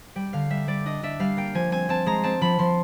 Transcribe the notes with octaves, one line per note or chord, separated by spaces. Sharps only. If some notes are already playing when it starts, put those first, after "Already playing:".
G3 G5
D3 F5
G3 E5
G3 D5
D4 D#5
D4 E5
G3 F5
A#3 G5
F3 G#5
C4 G#5
C4 A5
G#3 A#5
C4 A5
F3 B5
F3 C6